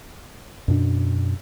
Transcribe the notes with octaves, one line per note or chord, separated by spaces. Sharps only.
F#2 B2 D4